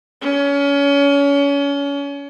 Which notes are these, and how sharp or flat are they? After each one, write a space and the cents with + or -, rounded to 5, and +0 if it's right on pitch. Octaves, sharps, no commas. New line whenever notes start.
C#4 +30